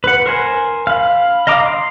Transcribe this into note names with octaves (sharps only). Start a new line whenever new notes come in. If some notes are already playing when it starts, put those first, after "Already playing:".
B4 F#5
A#4 C5 G#5
F5 B5
D#5 F5 A#5 D6 D#6
C6